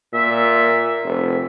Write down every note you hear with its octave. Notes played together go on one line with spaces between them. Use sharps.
A#2 E5
F1